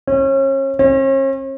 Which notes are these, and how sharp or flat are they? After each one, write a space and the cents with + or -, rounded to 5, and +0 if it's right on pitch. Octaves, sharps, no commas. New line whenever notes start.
C#4 -35
C#4 -45